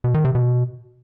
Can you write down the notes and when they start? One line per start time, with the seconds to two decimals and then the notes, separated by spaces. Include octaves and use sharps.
0.04 B2
0.14 D#3
0.25 C3
0.35 B2